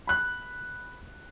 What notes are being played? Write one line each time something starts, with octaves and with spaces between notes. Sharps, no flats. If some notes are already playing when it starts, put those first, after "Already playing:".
B5 F#6